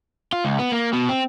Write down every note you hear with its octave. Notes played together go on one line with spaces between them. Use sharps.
F4
C#2
B3
A#3
B2
C4